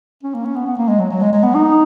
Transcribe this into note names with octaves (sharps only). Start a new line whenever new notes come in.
C#4
A#3
C#4
B3
B3
A#3
G#3
F#3
F#3
G#3
G#3
B3
D#4